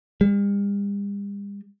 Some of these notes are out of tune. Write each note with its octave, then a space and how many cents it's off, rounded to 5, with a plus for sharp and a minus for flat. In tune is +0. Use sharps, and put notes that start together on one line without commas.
G3 +45